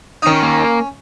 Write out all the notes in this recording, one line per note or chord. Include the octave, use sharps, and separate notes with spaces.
D#4
D#3 C#4
A#3